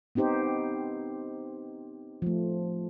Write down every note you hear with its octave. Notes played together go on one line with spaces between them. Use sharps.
B3 C4 D#4 G4 C5
F3 A3